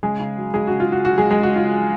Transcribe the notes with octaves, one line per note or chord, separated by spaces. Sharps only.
C#3 G#3 G#4
C#3
F#3
F#3 G#3 G#4
C#3 F#4
F4
C#3 F#4
F#3 F#4
G#3 G#4
F#3
G#3 G#4
C#3 F#4
C#3 F4
F#3